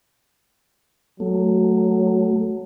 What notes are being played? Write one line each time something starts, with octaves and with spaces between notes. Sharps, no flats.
F#3 A3